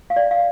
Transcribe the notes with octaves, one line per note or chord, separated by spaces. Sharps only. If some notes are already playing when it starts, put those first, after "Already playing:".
F5
D5
F5